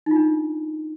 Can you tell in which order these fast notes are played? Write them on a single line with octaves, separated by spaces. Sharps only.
D#4 F4 D4